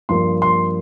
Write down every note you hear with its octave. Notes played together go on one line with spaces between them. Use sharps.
G2 F3 A#3 C6
C6